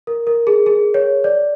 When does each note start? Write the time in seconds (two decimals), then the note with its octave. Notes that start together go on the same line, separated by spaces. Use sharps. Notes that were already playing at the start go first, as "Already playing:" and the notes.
0.07 A#4
0.27 A#4
0.47 G#4
0.66 G#4
0.94 C#5
1.24 D5